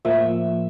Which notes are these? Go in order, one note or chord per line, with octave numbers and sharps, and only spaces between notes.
A2 F3 A#3 E5